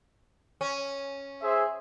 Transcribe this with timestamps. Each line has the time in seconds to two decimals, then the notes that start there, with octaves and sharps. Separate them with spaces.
0.61 C#4
1.42 G#4 C5 E5